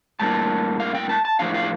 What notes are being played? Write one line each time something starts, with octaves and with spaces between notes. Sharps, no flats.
A2 G3 A#3 D4 A5
F5
G5
A5
A5
A2 F3 A#3 D4 F5
F5